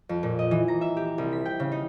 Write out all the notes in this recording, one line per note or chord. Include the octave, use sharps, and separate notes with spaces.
F2
A#2
D#5
E3
A#5
E5
G4
C2
B6
G5
C#3
D#4